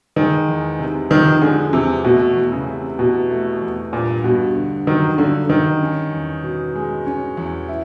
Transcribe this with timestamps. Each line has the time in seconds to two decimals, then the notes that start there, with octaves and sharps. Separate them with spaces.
0.16 D#3 G#3
0.48 E2
0.79 C3
1.11 D#3 F3
1.41 D3 G#3
1.73 E2 C3
2.04 B2 A3
2.36 E2
2.52 C#3
2.67 C3
2.98 B2 E3
3.31 A3
3.61 E2
3.93 G2 A#2
4.24 G2 B2
4.55 D3
4.87 D#3 F#3
5.18 G2 D3
5.50 G2 D#3
5.81 C#4
6.12 E2
6.43 B2
6.75 G#3
7.06 C#4
7.37 E2
7.68 E4